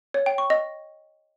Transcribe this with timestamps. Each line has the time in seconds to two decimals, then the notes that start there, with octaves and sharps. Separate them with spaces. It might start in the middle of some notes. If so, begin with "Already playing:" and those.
0.14 C#5
0.26 G5
0.38 C#6
0.50 D#5